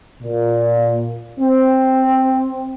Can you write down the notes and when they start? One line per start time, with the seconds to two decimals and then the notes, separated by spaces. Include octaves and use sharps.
0.21 A#2
1.38 C4